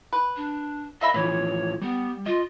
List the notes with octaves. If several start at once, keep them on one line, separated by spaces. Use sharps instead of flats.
B4
D4
A#3 D#5 E5 B5
A2 E3 F3 B4 C#5
G3 B3
F4 D#5